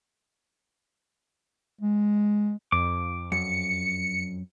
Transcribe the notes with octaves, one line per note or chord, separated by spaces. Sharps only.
G#3
F2 D6
F#2 C#7